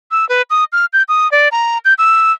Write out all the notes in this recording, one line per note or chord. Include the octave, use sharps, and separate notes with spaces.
E6
B4
D#6
F6
G6
D#6
D5
A#5
G6
E6